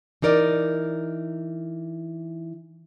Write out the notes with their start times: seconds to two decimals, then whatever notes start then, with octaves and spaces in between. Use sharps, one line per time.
0.22 E3 D#4 A#4 D5